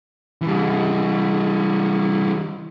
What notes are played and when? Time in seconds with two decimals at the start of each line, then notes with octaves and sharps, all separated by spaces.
0.42 E3 G3